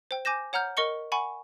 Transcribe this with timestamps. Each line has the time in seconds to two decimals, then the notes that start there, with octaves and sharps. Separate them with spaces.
0.11 C5 G5
0.25 G#5 D6 G6 A#6 E7
0.53 C#5 F#5 A#5 F6 G6
0.77 A#4 D#5 C#6 C#7 G7
1.12 F#5 G#5 B5 C#6